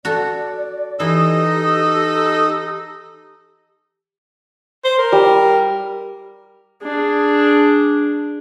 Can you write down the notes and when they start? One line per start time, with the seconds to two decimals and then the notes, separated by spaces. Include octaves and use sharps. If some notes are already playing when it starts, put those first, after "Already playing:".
0.05 F#4 A4 D5
1.00 E3 D#4 G4 A4 D#5
4.84 C5
4.98 A#4
5.12 G3
6.82 D4 G#4